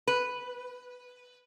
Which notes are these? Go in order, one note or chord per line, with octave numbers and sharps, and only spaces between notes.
B4